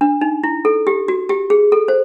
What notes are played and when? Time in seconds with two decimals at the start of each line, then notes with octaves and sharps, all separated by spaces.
0.01 D4
0.21 D#4
0.43 E4
0.65 A4
0.87 G4
1.08 F#4
1.29 G4
1.50 G#4
1.72 A4
1.88 C5